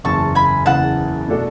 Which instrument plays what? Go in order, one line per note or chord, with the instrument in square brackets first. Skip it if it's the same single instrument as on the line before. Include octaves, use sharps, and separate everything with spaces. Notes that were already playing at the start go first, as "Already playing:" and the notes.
[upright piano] F#1 E2 C#3 E3 [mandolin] A5 C#6
[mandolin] G#5 B5
[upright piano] F#1 E2 C#3 E3 [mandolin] F#5 A5
[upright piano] B2 A3 D4 F#4 A4